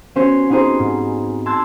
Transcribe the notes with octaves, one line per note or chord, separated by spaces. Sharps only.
B3 C#4 F#4 C5 C#5
B3 C4 D#4 F#4 G#4 C5
G#2
A5 C6 E6 F#6 G#6 A6